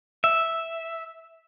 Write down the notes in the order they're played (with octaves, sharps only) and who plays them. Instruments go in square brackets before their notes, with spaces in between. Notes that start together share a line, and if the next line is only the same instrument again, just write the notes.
[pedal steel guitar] E5